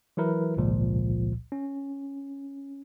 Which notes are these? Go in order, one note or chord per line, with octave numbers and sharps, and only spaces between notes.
E3 F#3 E4 A#4 B4
G#1 C#2 A#2 F3
C#4